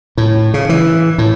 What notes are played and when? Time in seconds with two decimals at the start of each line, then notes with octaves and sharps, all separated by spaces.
0.17 A2
0.54 C#3
0.69 E3
1.18 A2